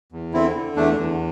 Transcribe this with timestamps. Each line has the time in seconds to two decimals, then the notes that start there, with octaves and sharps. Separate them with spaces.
0.12 E2
0.33 D3 C4 E4
0.56 D3
0.76 E2 A3 D4
0.98 E2